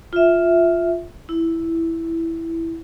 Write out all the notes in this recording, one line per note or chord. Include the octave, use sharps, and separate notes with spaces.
F4 E5
E4